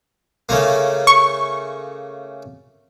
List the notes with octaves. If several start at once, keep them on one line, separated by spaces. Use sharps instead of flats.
C#3 A3 A#3
C#6